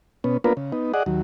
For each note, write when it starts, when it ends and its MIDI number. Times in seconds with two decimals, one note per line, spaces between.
0.24 0.37 47
0.24 0.37 59
0.24 0.37 61
0.44 0.53 58
0.44 0.53 59
0.44 0.53 62
0.44 0.53 65
0.44 0.53 70
0.44 0.53 71
0.57 0.72 49
0.72 0.92 59
0.72 0.92 63
0.94 1.03 68
0.94 1.03 74
0.94 1.03 75
0.94 1.03 78
1.06 1.22 39
1.06 1.22 54